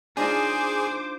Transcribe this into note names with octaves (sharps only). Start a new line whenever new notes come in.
D4 D#4 F4 G#4 C5 D6